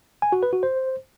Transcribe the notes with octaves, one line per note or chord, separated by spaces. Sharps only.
G#5
F#4
B4
F#4
C5